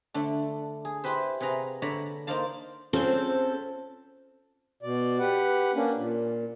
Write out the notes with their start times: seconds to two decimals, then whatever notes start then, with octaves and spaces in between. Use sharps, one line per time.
0.14 D3 A3 D4
0.85 G#4
1.04 E4 G4 B4 C5
1.40 C3 G#4 B4 F5 A#5
1.82 D3 C#5 D5 E5 A#5 B5
2.27 A#3 D#4 C5 D5 F5 A5
2.93 C4 C#4 F4 G#4 A4
4.83 B2 D5
5.19 G4 B4 F#5
5.74 A#3 C#4 D4
5.95 A#2